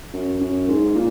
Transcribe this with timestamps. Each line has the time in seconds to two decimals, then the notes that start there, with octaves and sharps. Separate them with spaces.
0.13 F#2
0.40 F#2
0.68 G#2
0.95 A#2